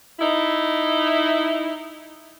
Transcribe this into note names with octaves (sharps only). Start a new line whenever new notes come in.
D#4 E4